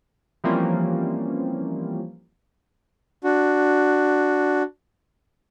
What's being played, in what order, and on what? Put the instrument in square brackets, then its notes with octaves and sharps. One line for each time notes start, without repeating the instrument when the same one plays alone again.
[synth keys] E3 F3 G3 A#3 C4 C#4
[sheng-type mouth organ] D4 F#4